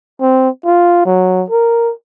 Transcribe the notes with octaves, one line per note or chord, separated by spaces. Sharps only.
C4
F4
F#3
A#4